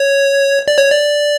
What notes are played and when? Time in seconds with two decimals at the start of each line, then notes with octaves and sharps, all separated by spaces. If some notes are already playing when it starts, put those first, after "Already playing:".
Already playing: C#5
0.68 D5
0.78 C#5
0.90 D5